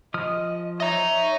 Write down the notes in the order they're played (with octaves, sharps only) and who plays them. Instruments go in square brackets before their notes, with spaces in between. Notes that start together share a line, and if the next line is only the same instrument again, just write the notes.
[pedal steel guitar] F3 D#6 F6 [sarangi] D#5
[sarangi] C#5 [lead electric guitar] D#5 A#5 [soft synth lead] E5